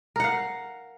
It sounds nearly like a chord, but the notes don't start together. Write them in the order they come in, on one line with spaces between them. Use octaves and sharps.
A#4 F#5 F5